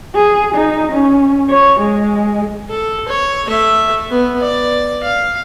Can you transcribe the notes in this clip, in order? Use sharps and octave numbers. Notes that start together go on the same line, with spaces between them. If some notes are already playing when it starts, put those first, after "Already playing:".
G#4
D#4
C#4
C#5
G#3
A4
C#5
A3 E5
B3
D5
F5